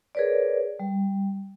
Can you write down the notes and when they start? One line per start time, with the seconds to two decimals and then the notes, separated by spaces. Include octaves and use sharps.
0.15 G#4 A#4 B4 C#5 D5
0.80 G3